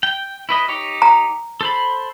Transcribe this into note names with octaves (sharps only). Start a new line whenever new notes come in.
G5
E4 B4 D#5
D#4 G4 C#5
A#5
A4 C5 B5